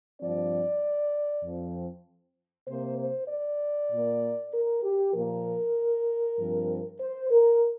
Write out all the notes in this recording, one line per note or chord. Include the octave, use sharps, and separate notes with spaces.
G2 F3 C4 D5
F2 F3 C4
C3 A#3 C5
C5
D5
A#2 A#3
A#4
G4
A#2 F3 A#3 A#4
G2 F3 C4
C5
A#4